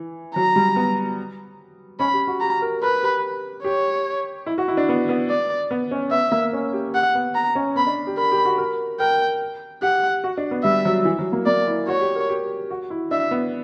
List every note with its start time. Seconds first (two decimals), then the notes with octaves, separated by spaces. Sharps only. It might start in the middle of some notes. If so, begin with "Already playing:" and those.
Already playing: E3
0.35 F#3 A#5
0.56 G3
0.76 B3
2.00 C#4 B5
2.14 G4
2.27 F#4
2.41 G4 A#5
2.62 A#4
2.82 A#4 B4
3.03 G4
3.64 G4 C#5
4.46 E4
4.58 F#4
4.68 E4
4.77 D4
4.89 B3
5.09 B3
5.29 D5
5.71 B3
5.91 C#4
6.11 B3 E5
6.32 A#3
6.53 C#4
6.73 G4
6.94 G4 F#5
7.15 B3
7.35 A#5
7.55 C#4
7.76 B3 B5
7.87 D4
8.07 G4
8.17 A#4 B5
8.32 G4
8.45 F#4
8.58 A#4
9.00 A#4 G5
9.82 G4 F#5
10.24 F#4
10.37 D4
10.51 B3
10.64 G3 E5
10.85 F#3
11.05 E3
11.19 F#3
11.33 A#3
11.46 A#3 D5
11.67 E4
11.88 F#4 C#5
12.01 G4
12.16 A#4
12.29 G4
12.70 F#4
12.90 E4
13.11 D4 E5
13.31 B3